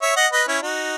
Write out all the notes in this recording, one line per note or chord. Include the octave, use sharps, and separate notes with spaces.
C#5 E5
D#5 F#5
B4 D#5
C#4 E4
D#4 F#4